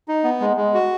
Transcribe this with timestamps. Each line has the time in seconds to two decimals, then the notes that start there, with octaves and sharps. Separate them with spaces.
0.08 D#4
0.24 B3
0.40 G#3
0.57 G#3
0.74 F#4